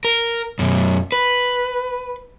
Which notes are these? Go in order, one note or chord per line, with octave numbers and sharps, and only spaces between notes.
A#4
F#2 B2
B4